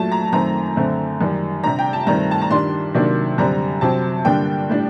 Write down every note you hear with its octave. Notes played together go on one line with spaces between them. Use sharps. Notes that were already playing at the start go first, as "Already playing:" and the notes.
Already playing: A#2 F#3 A3 A5
A#5
F#2 D#3 A3 C4 A#5
F#2 D3 A3 C4
F#2 D#3 G3
C3 G3 D4 A#5
G5
A5
G2 D#3 A3 C4 A#5
A5
A#5
G2 D#3 G3 D4 C6
C3 D#3 F#3 A#3 D4
F#2 D3 G3 C4 A#5
C3 F#3 C4 A5
G2 D3 G3 A#3 D4 G5
A2 G3 D4